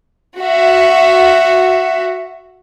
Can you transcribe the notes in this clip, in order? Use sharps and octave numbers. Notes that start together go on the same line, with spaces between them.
F#4 E5